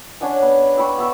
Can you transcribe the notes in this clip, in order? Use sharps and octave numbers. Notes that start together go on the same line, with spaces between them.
C#4 D4 F#5 G#5
B3
E5 G5 B5 C#6
B3 E5 C#6